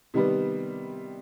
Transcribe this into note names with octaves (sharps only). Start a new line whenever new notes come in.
C3 D#3 G3 B3